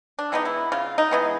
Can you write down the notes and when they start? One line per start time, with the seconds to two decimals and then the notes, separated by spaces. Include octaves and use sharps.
0.19 D4
0.32 E3 G#3 B3 D#4
0.45 E4
0.72 C#3 F4
0.98 D#4
1.11 E3 G#3 B3